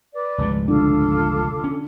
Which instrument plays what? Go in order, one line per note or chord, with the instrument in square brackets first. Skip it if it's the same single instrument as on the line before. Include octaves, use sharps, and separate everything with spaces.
[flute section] B4 D5 D6
[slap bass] F1 C#2 G#2
[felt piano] D3 [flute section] F4 A4 D6
[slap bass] C#4